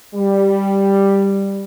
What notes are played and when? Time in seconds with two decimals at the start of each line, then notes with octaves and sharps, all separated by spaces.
0.15 G3